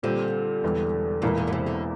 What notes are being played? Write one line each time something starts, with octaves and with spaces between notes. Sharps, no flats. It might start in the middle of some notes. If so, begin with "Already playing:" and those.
A#2 D3 G3 C4 G4
E1 E2 E3 G3
E1 E2 A#2 E3 A#3 E4
D3
A#2
C3
D3